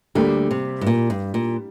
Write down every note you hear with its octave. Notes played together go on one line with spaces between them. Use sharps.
D2 D3 G3 A#3 G4
C3
G2
A#2
G2
A#2